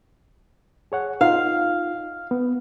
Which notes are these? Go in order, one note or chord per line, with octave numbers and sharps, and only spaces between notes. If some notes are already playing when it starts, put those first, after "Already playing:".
G#4 C#5 F#5
D#4 F4 F5
B3